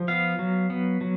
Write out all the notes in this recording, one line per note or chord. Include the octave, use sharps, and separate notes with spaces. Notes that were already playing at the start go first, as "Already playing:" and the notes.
Already playing: F3
B3 F5
F#3
B3
F#3